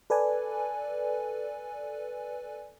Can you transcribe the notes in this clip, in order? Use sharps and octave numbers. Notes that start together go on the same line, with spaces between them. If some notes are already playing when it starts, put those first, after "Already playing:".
A4 B4 D5 G#5